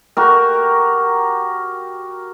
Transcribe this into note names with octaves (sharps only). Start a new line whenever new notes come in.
F#4 G4 A#4